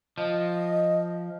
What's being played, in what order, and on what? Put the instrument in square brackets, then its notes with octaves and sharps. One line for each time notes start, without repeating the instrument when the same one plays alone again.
[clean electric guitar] F3 [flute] D#5